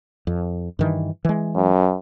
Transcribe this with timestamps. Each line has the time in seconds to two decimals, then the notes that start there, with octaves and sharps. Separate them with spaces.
0.27 F2
0.79 G2 D#3 E3
1.25 E3 G#3
1.55 F#2